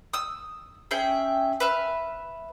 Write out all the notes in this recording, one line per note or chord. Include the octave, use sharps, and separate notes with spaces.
D#6 E6
C#4 G#4 E5 G5
B4 E5 F6